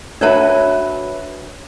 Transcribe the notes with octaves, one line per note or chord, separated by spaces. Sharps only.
D4 F#4 B4 C#5 E5 A5